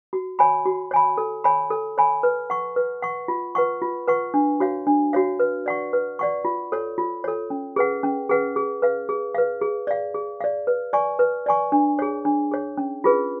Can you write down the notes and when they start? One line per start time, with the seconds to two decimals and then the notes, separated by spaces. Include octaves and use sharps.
0.13 F#4
0.39 C#5 G#5 B5
0.66 F#4
0.91 C#5 G#5 B5
1.18 A4
1.44 C#5 G#5 B5
1.70 A4
1.98 C#5 G#5 B5
2.23 B4
2.50 F#5 C#6
2.76 B4
3.02 F#5 C#6
3.28 F4
3.55 B4 F#5 C#6
3.82 F4
4.08 B4 F#5 C#6
4.34 D4
4.60 F#4 C#5 F5
4.87 D4
5.13 F#4 C#5 F5
5.40 B4
5.66 D5 F#5 C#6
5.93 B4
6.19 D5 F#5 C#6
6.45 F4
6.72 A4 C#5
6.98 F4
7.24 A4 C#5
7.50 C#4
7.76 G#4 B4 F#5
8.03 C#4
8.29 G#4 B4 F#5
8.56 G#4
8.82 B4 F5
9.09 G#4
9.35 B4 F5
9.61 G#4
9.87 D5 F5
10.14 G#4
10.41 D5 F5
10.67 B4
10.93 D5 G#5 C#6
11.19 B4
11.46 D5 G#5 C#6
11.72 D4
11.99 G#4 C#5
12.25 D4
12.51 G#4 C#5
12.78 C#4
13.04 F4 G#4 B4